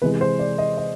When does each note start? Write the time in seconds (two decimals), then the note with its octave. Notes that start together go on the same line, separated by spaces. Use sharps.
0.02 C3 E3 G#3 B4
0.21 C5
0.39 D5
0.58 D#5
0.78 D#5